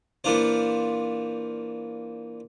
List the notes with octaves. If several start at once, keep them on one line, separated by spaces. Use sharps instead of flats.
A#2 E3 D4 F4 C5